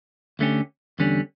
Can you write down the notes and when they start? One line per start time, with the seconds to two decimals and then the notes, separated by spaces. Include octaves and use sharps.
0.39 D2 D3 A3 C#4 G4
0.99 E2 D3 G3 C#4